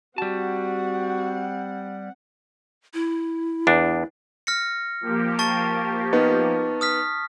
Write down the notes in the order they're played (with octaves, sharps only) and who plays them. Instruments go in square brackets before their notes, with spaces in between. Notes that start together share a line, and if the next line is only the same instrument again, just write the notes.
[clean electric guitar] G3 A5 [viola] C4 F#5 [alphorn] F#4
[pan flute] E4
[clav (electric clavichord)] E2 D4
[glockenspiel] F6 A#6 C#7
[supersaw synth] F3 A#3 G4
[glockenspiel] A5 C#6 A6
[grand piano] B3 D#4
[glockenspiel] D#6 F6 B6